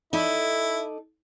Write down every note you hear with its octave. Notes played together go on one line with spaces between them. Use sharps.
D#4 E4 A4 D5